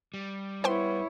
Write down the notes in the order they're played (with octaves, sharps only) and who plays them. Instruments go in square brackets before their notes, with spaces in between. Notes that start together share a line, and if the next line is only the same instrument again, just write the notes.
[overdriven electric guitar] G3
[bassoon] B3 [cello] E4 C#5 [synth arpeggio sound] C5 G5 C6